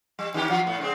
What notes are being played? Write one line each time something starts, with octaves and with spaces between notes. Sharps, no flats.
G3
D#3 C#4 G4
F3 F#3 F4
A2 B3
C#3 G#3 C4